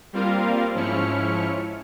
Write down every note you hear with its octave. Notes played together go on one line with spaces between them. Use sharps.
G3 A#3 C4 F4 A#4 F5
G#2 F3 C#4 E4 F6 C#7